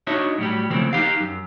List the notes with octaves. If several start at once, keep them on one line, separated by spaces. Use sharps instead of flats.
D4 D#4 F#4 C#5 D#5 E5
A2 F#3 G3 G4
C#3 E3 F3 A3 A#3 C4
D#4 G4 F5
F#2